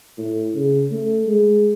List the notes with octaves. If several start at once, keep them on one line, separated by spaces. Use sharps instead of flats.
A2
C#3
A3
G#3